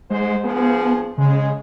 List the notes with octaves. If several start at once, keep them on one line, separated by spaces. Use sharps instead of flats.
G#2 G#3 C5
G2 F3 B3 G#4
C#3 G#3